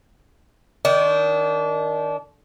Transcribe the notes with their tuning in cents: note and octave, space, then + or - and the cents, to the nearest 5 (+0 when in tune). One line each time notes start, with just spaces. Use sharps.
D#3 +0 D4 -25